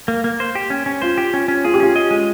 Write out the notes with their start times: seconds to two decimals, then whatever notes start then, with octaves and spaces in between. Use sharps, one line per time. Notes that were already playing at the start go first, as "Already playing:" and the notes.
0.08 A#3
0.24 A#3
0.40 C5
0.55 G4
0.70 C#4
0.86 C#4
1.02 F4 C5
1.18 G4
1.34 C#4
1.48 C#4
1.64 F4 G#4
1.74 G4
1.80 C#4 F4
1.96 D#5
2.11 G#3